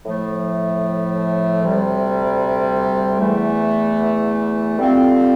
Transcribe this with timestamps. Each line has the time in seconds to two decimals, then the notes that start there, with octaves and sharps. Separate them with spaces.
0.05 A2 F3 A3
1.63 D2 C3 G3
3.20 E2 E3 A3
4.78 D3 G3 C4 F4